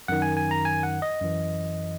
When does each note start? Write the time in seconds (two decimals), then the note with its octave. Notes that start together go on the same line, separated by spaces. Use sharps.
0.08 F#2 D#3 F#5
0.22 G#5
0.37 G#5
0.51 A#5
0.65 G#5
0.83 F#5
1.02 D#5
1.21 F#2 E3